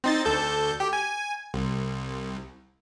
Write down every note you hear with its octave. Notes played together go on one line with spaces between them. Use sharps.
C4 D#4 A6
D2 A4 G6
G4
G#5
C2